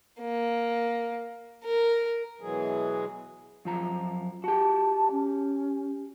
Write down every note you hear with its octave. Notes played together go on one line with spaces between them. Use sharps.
A#3
A#4
B2 E3 F#3 G#3 G#4
F#2 F3 A#5
F#4 G4 A5
C#4